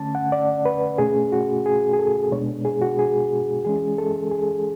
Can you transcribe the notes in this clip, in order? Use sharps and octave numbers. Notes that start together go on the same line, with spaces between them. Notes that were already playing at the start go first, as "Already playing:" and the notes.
Already playing: D3 A3 C#4 A5
F#5
D5
B4
B2 A3 C#4 G#4
F#4
G#4
G#4
A4
B2 G#3 B3 D4 C#5
G#4
F#4
G#4
E3 G#3 C#4 G#4
A4
G#4